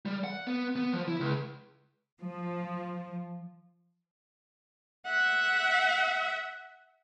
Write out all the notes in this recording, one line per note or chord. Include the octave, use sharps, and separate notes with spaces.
G3
F#5
B3
B3
F3
E4
C#2
F3
E5 F#5